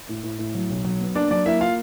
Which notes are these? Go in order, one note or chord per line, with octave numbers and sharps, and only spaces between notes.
A2
A2
A2
F#3
B1
F#3
B3
A#3 D4 D5
F#3 D4 D5
A#3 E4 E5
A#3 F4 F5